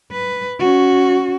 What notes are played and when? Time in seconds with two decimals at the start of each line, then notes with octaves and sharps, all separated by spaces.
0.12 B4
0.59 C#4 F#4